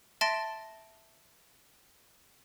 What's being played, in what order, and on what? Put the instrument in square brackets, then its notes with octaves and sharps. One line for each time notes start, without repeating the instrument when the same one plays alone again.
[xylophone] E5 A5 C6 A6 A#6 D7